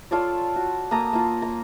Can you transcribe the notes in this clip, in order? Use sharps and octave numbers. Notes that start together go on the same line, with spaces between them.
F4 A4 C#5 D5
F#4
A#3 A4 A#5 D#6
A#3 F4
A#5